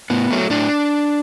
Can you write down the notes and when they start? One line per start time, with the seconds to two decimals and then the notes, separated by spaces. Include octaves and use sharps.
0.10 A2 B3
0.31 F#3 A3
0.50 A2 D4